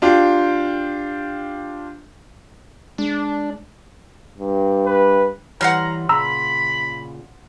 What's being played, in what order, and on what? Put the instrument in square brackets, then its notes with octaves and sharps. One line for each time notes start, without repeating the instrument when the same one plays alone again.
[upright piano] D4 F4 G4
[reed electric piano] G#3 [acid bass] D4
[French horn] G2
[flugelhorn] B4
[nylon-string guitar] E3 G3 C#5 [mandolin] F#5 C6 F6 [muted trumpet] A#5
[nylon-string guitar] A#2 C#3 [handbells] A#5 E6 [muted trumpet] B5